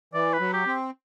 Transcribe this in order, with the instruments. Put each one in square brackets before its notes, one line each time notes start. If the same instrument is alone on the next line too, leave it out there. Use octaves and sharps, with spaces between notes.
[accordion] E3 [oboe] D5
[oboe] B4
[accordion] F#3
[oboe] G4
[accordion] C4